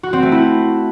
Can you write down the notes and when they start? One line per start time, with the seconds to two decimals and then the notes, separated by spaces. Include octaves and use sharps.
0.03 F#4
0.13 C4
0.22 A3
0.32 E4